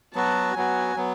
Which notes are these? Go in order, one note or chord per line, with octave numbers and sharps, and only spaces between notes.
F#3 B3 F#4 A5
F#3 B3 F#4 G#5
F#3 B3